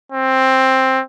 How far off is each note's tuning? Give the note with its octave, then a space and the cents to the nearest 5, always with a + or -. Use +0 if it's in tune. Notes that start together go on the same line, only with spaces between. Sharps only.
C4 +10